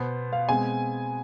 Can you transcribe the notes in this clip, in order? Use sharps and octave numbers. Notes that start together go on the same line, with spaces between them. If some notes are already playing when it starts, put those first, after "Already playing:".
Already playing: B2 B3 C5
F5
B2 G#3 C4 G#5